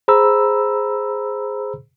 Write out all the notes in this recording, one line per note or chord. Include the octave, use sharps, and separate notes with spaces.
G#4 C5 A#5 B5 E6